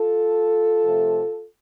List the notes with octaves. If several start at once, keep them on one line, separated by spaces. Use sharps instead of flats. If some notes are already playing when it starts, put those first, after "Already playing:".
Already playing: F4 A4
C3 F3 A3